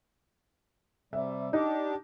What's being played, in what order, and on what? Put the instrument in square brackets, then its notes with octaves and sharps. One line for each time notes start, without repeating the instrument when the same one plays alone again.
[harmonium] C3 G3 [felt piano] E5
[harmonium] D4 G4 [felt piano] D#4